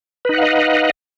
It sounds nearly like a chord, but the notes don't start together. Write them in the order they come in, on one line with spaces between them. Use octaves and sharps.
B4 D#4 F#5 F5 D#5